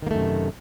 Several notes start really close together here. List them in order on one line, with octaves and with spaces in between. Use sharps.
D#3 A#3 A3 F#2 C3